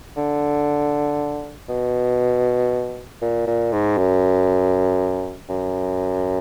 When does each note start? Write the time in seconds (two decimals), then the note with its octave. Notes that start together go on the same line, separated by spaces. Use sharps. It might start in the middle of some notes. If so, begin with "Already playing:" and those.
0.17 D3
1.69 B2
3.22 A#2
3.47 A#2
3.72 G#2
3.98 F#2
5.49 F#2